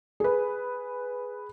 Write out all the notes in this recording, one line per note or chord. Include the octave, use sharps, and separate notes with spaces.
G#4 B4